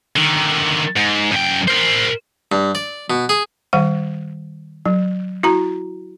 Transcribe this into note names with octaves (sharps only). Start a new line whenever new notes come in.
D3 D#3
G#2
F#2 G5
A#4 C5
G2
D5
B2
G#4
D#3 G3 F#5
F#3
E4 F#4 A#5